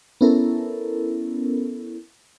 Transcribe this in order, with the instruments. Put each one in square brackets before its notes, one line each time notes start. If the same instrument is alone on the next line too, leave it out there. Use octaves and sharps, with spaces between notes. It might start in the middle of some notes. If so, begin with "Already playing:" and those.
[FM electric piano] B3 C#4 E4 A4 A#4